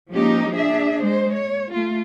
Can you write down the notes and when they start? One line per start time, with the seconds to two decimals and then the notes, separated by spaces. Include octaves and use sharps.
0.13 F3 G#3 A#3 C#4 D#4 G4
0.56 D4 G#4 E5
1.02 G#3 C5
1.34 C#5
1.73 A3 F4